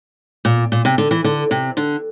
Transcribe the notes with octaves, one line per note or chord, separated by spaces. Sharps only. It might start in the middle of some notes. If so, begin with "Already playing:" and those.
A#2
A#2
C3
D3
E3
D3
C3
D3